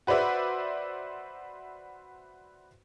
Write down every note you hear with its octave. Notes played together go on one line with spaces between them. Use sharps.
F#4 B4 C5 D5 E5